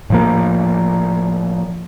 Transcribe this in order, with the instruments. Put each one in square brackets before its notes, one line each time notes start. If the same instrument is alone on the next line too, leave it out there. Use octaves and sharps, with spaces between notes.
[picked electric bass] A2 F3 A#3